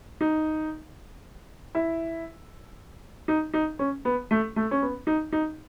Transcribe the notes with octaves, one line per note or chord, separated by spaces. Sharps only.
D#4
E4
D#4
D#4
C#4
B3
A3
A3
C#4
B3
D#4
D#4